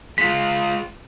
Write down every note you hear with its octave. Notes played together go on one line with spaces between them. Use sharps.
G#3 F4 B6